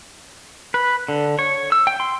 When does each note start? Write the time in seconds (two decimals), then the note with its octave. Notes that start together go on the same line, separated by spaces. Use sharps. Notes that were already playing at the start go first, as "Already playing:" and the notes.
0.74 B4
1.08 D3
1.39 C#5
1.72 E6
1.87 G5
2.00 C6